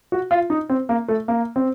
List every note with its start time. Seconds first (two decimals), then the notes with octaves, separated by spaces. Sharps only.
0.12 F#4
0.31 F4
0.50 D#4
0.70 C4
0.89 A#3
1.09 A3
1.28 A#3
1.56 C4